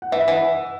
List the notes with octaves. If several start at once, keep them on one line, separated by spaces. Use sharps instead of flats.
F#5
E3 E5
F#5
E3